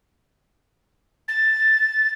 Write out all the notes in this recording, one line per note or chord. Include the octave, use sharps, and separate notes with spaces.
A6